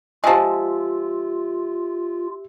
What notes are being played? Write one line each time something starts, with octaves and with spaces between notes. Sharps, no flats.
F3 G#3 F4 G4 E5